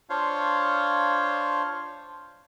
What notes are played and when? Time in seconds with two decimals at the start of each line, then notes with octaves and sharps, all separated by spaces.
0.10 D4 F4 C5 C#5 F5